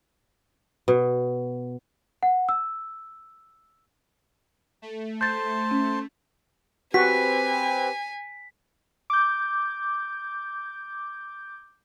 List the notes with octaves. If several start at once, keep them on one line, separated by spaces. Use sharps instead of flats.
B2
F#5
E6
A3
C5 A5 C6 G6 A6
C#4
C4 F#4 G4 B4 G#5 B6
D6 G6